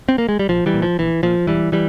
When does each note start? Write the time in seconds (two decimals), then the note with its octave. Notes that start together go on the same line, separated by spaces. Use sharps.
0.09 C4
0.18 A#3
0.29 G#3
0.39 G3
0.49 A#1 F3
0.66 E3 G3
0.74 A#2
0.82 F3
0.99 A#1 E3
1.23 A#2 F3
1.47 E1 E3 G3
1.72 E3 G3